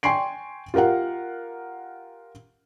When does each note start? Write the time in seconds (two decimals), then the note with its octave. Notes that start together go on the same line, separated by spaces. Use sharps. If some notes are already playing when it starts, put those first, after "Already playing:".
0.03 G5 G#5 C6 C#6 C7 D7
0.74 F4 G4 A#4 F5 F#5